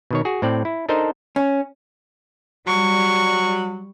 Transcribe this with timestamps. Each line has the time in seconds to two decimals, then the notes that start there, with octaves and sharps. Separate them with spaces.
0.11 B2 D#3 C#5
0.25 F#4 G#4
0.42 A2 C4 D5
0.65 E4
0.89 D4 D#4 A4 A#4 C5 D#5
1.36 C#4
2.67 F#3 G3 C#6